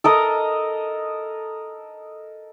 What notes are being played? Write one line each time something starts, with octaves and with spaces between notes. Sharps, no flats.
A4 A#4 D#5